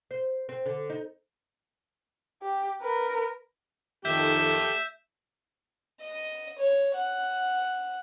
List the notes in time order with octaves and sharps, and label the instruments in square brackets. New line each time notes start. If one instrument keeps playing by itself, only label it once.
[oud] C5
C4
D3
D#4
[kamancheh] G4
A#4 B4
[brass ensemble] F2 D#3 [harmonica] A3 G4 [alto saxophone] E5 [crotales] G6 E7
[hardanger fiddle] D#5
C#5
F#5